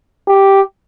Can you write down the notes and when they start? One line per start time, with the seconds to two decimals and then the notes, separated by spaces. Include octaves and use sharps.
0.28 G4